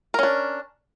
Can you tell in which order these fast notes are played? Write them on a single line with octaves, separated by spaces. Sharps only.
A#4 C#4 D4